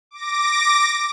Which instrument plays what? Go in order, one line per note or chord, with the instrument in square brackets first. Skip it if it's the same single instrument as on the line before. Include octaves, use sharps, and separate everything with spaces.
[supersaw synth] D6 A#6